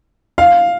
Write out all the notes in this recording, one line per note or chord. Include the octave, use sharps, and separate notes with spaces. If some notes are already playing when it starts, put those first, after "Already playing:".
F5